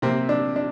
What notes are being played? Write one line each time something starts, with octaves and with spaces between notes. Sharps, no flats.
C3 A#3 C4
D4
D4